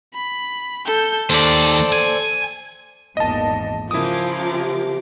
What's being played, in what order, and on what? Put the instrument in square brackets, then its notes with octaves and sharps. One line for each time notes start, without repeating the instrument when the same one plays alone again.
[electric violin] B5
A4 G6
[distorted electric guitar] D#2 [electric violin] A4 [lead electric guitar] C5 D5
[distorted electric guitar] G#5
[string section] G#1 E2 A#2 [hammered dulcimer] D3 A#3 [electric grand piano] D#5 A5
[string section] C#3 A#4 D6 [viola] F3 [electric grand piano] E4 D#6
[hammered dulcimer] C3